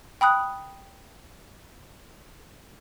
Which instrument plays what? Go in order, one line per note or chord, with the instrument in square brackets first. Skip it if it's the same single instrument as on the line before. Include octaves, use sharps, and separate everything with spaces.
[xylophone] G5 B5 D#6 F#6